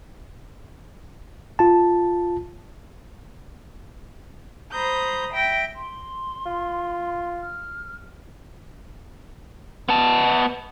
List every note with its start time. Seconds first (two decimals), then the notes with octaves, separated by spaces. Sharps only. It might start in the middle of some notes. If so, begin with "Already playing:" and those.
1.59 F4 A5
4.72 C5 A#5 B5 D#6 G6
5.34 E5 G5 A#6
5.76 C6
6.46 F4
7.41 F6
9.89 B3 A5